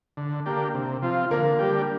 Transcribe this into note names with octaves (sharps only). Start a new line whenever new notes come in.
D3
A#3 D4 G4
C3
F3 C4 F4
D3 A#3 A#4
G3 D4 G4